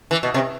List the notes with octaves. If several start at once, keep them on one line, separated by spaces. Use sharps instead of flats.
E3
B2
C3